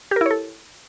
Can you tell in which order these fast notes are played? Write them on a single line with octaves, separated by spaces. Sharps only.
G4 A#4 E4 C#5 A4